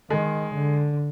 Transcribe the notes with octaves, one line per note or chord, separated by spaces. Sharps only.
D#3 G#3
D3